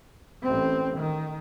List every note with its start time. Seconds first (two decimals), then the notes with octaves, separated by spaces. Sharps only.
0.43 A1 C4
0.97 D#3